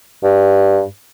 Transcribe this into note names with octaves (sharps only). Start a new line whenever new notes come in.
G2